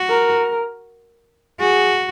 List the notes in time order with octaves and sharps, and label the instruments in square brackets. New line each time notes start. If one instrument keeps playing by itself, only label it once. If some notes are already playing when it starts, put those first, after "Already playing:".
Already playing: [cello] F#4
[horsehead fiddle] A#4
[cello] F#4 [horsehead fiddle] G#4